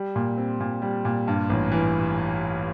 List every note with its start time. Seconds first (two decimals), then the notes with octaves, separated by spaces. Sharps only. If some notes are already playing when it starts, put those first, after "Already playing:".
Already playing: G3
0.16 A#2
0.38 C4
0.60 A#2
0.82 G3
1.05 A#2
1.28 G2
1.50 A1
1.72 E3